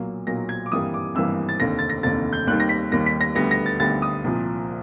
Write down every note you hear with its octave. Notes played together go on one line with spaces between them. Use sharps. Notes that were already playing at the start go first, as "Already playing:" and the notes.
Already playing: B1 A#2 F#3 A#3
B1 A#2 F#3 A#3 A#6
G#6
D6
G#1 G2 E3 G3 A#3 D#6
D6
G#1 G2 E3 G3 A#3 E6
A6
F1 D#2 D3 A#6
A6
A#6
F1 D#2 D3 A6
G6
D#2 D#3 G3 F#6
A#6
B6
D#2 D#3 G3 A#6
B6
A#6
D2 D3 G3 B3 A#6
A#6
A6
D2 D3 G3 B3 A6
D#6
C2 A#2 F3